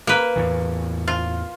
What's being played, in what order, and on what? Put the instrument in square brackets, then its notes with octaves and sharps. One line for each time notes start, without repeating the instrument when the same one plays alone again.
[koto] A#3 B4
[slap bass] E2 A2 E3
[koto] F4